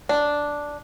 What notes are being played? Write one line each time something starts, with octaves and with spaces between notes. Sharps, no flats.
D4